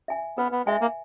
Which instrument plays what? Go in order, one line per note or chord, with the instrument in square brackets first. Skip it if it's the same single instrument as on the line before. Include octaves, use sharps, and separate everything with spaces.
[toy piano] E5 G#5
[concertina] B3 [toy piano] B4
[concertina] B3
[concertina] G#3 [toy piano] E5 G#5
[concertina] A#3